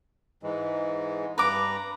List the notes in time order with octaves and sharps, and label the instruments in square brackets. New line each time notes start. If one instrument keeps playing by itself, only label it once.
[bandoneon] G#2 E3 G#3
[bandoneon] G2 A#5 [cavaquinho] B4 D6